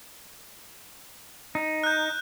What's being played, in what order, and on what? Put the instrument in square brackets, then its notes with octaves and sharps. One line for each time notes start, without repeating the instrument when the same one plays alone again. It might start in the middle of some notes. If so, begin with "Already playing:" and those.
[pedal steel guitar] D#4
[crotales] F#6 G6